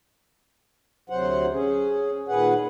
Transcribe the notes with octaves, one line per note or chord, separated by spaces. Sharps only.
D2 C3 F#3 C5 F#5
C#4 G#4
A#2 D#3 G#4 B4 F#5